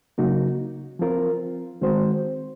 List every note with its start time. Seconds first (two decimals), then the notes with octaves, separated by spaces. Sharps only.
0.18 C#3 F#3 A#3 D#4 F#4
0.99 F3 C4 F4 A#4
1.81 D#3 G#3 C4 F#4 C5